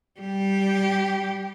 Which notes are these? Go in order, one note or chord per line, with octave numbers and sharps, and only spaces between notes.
G3 G4